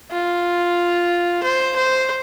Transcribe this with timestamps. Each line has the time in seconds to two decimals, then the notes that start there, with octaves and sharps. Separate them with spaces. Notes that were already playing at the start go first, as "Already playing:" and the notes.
0.12 F4
1.43 C5
1.76 C5